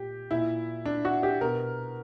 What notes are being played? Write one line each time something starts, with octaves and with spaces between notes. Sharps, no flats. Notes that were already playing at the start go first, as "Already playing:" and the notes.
Already playing: A#2 G4
A#2 E4
D4
F#4
G4
B2 A#4